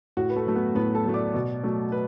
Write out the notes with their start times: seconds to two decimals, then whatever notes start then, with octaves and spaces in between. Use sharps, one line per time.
0.17 A2 F#4
0.30 B4
0.36 A3 A4
0.47 F#3 A3
0.56 B3 B4
0.75 A2 B3 B4
0.95 A4 A5
1.05 F#3 A3
1.14 D5 D6
1.34 B2
1.63 F#3 A3
1.92 B4